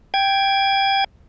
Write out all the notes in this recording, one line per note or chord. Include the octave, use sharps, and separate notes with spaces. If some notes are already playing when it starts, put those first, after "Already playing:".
G5 G#6